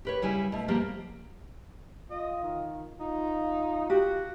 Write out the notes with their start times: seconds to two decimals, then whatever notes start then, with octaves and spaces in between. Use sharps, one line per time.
0.05 G4 B4 C#5
0.22 C#3 G3 E4 G#5
0.52 B2 A3
0.68 F3 G3 A#3 B3 G4
2.11 F4 D#5
2.43 D#3
3.00 D#4 F4
3.90 F#4 G4